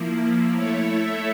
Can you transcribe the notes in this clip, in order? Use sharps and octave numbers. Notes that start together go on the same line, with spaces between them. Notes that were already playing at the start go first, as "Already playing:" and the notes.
Already playing: F3 A#3 E4
A3 E4 A4 C#5 E5